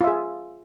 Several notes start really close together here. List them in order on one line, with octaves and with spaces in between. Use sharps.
F4 E5 G#4